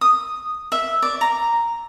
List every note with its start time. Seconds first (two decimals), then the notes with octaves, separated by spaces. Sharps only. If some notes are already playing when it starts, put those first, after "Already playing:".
0.01 D#6
0.72 E5
1.02 D5
1.21 A#5